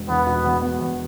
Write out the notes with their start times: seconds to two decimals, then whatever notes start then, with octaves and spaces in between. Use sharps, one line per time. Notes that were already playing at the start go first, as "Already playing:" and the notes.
Already playing: E1
0.08 E2 B3
0.27 B2
0.44 E2
0.62 B3
0.79 E2